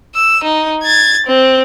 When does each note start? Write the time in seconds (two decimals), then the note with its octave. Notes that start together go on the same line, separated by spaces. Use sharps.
0.15 E6
0.44 D#4
0.83 G#6 A6
1.26 C4